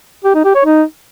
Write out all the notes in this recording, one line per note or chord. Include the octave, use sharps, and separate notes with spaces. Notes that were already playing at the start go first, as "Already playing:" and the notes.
G4
D#4
G4
C#5
D#4